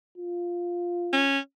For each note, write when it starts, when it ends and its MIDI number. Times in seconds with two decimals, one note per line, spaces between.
0.18 1.31 65
1.13 1.39 61